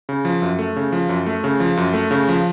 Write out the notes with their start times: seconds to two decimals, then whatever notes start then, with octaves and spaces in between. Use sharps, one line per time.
0.09 C#3
0.25 F3
0.42 F#2
0.59 A3
0.76 C#3
0.92 F3
1.09 F#2
1.27 A3
1.44 C#3
1.60 F3
1.77 F#2
1.94 A3
2.11 C#3
2.29 F3